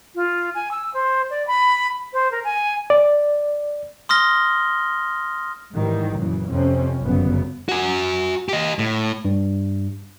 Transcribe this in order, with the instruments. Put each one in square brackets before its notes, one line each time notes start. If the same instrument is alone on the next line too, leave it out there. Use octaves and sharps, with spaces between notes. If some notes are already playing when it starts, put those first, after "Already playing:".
[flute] F4
G#5
E6
C5
D5
B5
C5
A#4
G#5
[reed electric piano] D5
[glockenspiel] C6 D#6 F6 A#6 G7
[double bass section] G#2 D#3 E3 G3
F#2 A#2 C#3 E3
F2 C3 C4 C#4
G1 F#2 C#3 B3
[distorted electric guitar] F#4 G#5
G4 D#5
A2
[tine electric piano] G2